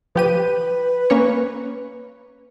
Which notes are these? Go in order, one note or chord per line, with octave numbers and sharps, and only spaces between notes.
F3 G4 B4 D#7
A#3 C#4 C#5